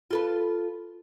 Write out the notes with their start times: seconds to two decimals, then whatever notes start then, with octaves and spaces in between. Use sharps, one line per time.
0.11 F4 A4 B4